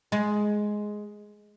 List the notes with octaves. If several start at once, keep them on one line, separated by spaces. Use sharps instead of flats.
G#3